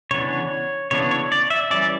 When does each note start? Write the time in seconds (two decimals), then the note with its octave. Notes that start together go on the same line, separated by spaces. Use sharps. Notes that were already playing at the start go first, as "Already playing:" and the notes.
0.11 C#3 E3 B3 D4 C#5
0.91 C#3 E3 B3 D4 C#5
1.11 C#5
1.32 D5
1.50 E5
1.70 E3 G3 C#4 D5